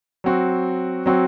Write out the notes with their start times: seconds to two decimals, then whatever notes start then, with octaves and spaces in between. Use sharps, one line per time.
0.24 F#3 C4 F#4
1.06 F#3 C4 F#4